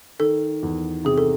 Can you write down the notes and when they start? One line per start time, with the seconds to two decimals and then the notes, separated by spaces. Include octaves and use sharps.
0.19 D#3 A4
0.63 E2
1.05 C3 G#4
1.18 A4